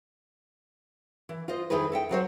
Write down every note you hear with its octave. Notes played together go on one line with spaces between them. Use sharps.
E3
F4 C5 D#5
F2 D#3 E4 G#4 B4
A4 E5 G5
D2 F#3 C5 C#5